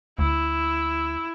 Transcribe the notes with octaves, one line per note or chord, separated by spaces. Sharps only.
D2 E4